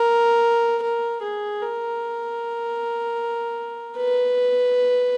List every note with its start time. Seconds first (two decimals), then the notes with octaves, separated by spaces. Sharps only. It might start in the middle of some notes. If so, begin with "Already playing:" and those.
Already playing: A#4
0.83 A#4
1.22 G#4
1.61 A#4
3.97 B4